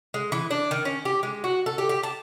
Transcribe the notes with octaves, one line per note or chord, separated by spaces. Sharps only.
G#3
E3
D4
D#3
C#4
G4
G#3
F#4
A4
G4
G4
A5